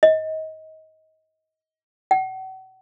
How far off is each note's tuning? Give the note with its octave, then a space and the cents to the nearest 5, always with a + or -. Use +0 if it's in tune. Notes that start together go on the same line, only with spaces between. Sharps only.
D#5 +25
F#5 +40